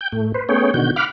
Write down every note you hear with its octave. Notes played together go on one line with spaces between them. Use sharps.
G5 G6
A2 A3
B4 C5
A3 B3 C#4 G#4 C#5 G5
B2 D3 D#3 F#4 G6
F5 F#5 B5 D6 F6